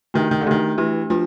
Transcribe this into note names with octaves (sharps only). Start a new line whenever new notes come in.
D#3 A3 D4 G4
D#3
D3
D#3 A3 D4 G4
E3 A3 D4 G4
F3 A3 D4